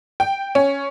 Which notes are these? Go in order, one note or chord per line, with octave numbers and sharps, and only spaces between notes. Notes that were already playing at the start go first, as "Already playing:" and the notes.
G5
C#4